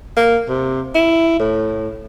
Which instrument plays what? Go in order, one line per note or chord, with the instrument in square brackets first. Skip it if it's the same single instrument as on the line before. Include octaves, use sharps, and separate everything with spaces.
[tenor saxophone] A#3
C3
E4
A2